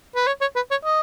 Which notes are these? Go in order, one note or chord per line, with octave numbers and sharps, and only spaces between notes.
B4
C#5
C#5
B4
C#5
D#5